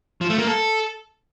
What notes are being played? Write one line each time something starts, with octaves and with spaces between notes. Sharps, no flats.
F3
A3
A#3
A4